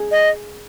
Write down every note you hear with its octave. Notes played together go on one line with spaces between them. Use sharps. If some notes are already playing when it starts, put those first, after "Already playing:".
Already playing: G#4
D#5